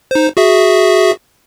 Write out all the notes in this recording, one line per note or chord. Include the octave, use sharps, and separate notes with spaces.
D#4 C5
F#4 G#4 E5